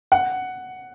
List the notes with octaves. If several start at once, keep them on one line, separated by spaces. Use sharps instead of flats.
F#5